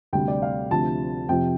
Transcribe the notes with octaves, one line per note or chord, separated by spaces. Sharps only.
D2 C3 G3 G5
D5
F5
D2 C3 F3 A5
F2 C3 F3 G5